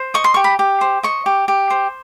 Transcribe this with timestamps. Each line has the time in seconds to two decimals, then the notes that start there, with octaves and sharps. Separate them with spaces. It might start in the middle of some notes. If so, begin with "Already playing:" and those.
Already playing: C5
0.14 D#5 C#6
0.24 C6
0.34 G4 C#6
0.44 B5
0.59 G4
0.81 C5
1.03 D#5 C#6
1.26 G4
1.48 G4
1.70 C5